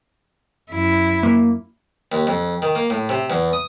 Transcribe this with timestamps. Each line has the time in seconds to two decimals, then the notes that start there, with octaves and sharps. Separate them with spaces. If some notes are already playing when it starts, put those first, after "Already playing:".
0.71 F#2 E4
1.23 A#3
2.12 D#2
2.27 F2
2.62 D#3
2.75 A#3
2.90 A2
3.09 C3
3.30 E2
3.53 D#6